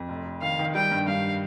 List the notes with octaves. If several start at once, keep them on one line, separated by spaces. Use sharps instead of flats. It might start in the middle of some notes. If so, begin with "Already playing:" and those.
Already playing: F2
F1
F1
D#3 F5
D#3
G3 G5
G2
G2 F5